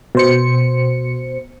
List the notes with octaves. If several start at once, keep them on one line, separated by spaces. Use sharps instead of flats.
B2 C5 C#7